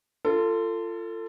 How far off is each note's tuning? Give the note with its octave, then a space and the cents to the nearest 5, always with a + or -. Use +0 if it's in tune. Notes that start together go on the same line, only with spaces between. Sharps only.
F4 -20 A4 +25